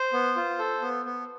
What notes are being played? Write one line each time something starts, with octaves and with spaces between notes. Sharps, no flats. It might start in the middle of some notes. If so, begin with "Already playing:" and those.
Already playing: C5
B3
F4
A4
B3
B3